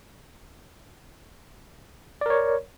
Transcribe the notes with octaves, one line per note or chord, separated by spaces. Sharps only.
A#4 C#5 D5